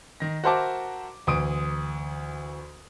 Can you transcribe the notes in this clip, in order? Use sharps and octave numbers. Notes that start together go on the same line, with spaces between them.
D#3 A#6
F#4 A#4 C5 E5 A5 D6
D2 E3 D#6 D7